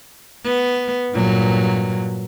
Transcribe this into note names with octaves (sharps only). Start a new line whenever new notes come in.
B3
G2 A#2 F#3